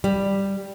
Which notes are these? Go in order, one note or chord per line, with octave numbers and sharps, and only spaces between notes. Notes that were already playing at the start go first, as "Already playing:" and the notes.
G3